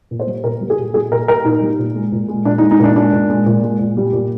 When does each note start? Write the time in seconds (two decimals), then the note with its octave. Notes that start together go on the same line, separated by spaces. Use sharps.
0.11 A#2
0.20 C5
0.27 G3
0.44 A#2 A#4
0.61 G3
0.70 G#4
0.78 A#2
0.94 G3 G#4
1.11 A#2 A#4
1.28 G3 A#4
1.45 A#2 D#4
1.62 G3
1.79 A#2
1.95 G#3
2.12 A#2
2.28 G#3
2.45 A#2 D4
2.58 D#4
2.62 G#3
2.71 D#4
2.80 A#2 D4
2.96 G#3 D4
3.13 A#2
3.30 G#3
3.46 A#2
3.63 G#3
3.79 A#2
3.97 G3
4.13 A#2